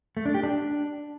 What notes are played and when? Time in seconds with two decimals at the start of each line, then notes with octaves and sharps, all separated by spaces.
0.17 A3
0.26 D4
0.34 G4
0.43 D4